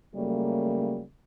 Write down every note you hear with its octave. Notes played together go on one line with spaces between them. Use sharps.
C#3 F#3 G3 A3 A#3